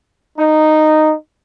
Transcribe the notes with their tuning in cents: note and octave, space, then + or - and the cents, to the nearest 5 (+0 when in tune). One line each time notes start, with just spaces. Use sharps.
D#4 -10